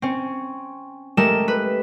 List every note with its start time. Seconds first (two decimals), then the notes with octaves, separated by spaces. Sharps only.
0.02 C4 C#4
1.17 G#3 A3 G4 A#4 E7
1.48 B4